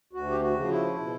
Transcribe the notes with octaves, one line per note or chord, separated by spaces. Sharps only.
D2 F#4
G4
F#4
C#3 F3
E4
B2